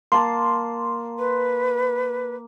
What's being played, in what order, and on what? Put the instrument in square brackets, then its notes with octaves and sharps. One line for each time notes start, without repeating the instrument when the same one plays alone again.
[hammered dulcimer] A#3 A5 [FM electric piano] C6
[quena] B4